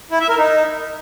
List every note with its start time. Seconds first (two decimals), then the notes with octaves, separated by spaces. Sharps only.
0.11 E4
0.20 E5
0.29 A#4
0.38 D#4